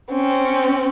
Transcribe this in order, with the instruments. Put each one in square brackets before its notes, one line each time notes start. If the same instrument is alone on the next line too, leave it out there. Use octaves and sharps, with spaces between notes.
[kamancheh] C4 C#4